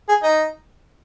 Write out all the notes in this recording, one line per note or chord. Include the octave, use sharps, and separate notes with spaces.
G#4
D#4